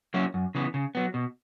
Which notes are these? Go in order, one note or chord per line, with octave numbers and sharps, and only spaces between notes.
F#3 A#3 C#4 E4
F#2
C#3 E3 B3
C#3
F#3 B3
B2